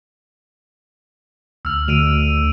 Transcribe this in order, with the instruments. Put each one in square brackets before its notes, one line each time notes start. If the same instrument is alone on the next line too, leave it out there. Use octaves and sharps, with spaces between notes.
[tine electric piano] D2 F6 [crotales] E6
[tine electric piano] D2 [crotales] D7 D#7 F7